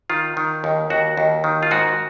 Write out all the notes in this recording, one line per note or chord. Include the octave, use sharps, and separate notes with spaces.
D#3 F4
D#3
D#2
D#2 F#4
D#2
D#3
F4
G#2 F#4